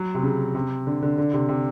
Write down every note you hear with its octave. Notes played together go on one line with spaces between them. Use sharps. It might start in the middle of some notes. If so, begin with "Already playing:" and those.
Already playing: F#3
C3
C#3
C3
D3
D3
D3
C3
C3